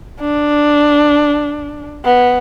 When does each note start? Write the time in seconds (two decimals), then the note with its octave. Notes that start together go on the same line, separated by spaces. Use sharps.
0.20 D4
2.05 B3